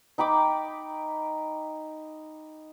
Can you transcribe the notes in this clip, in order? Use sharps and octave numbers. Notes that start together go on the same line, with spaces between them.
D#4 G5 B5 D6